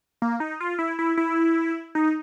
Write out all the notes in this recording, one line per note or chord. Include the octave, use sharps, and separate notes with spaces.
A#3
D#4
F4
E4
E4
E4
D#4